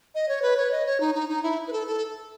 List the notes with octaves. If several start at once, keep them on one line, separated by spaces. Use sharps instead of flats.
D#5
C#5
B4
C#5
D#5
C#5
D#4
D#4
D#4
E4
B4
A4
A4